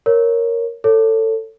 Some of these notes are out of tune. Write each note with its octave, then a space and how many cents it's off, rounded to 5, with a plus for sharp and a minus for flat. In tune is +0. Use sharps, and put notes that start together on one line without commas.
A#4 +0 C#5 +0
A4 +20 C#5 +0